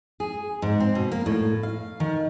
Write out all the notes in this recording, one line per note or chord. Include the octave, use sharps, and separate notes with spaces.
G#4
G#2
C4
B2
A#3
A2
F5
D#3